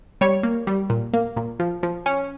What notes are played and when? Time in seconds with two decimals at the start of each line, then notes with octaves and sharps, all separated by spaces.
0.21 G3 C#5
0.43 A#3
0.67 G3
0.90 A#2
1.13 A#3
1.37 A#2
1.60 F3
1.83 F3
2.06 C#4